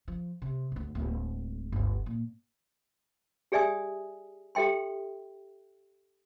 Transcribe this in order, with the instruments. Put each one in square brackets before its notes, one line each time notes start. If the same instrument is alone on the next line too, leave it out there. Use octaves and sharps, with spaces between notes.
[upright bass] F3
C3
G#1 D2
D1 G#3
G1 D2
A#2
[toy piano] G4 G#4 D5 E5 G#5 D#6
G4 A4 E5 G5 C6